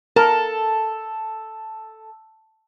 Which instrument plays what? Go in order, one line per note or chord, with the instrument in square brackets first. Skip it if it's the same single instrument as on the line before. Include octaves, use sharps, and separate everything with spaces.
[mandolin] A4 [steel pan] A#4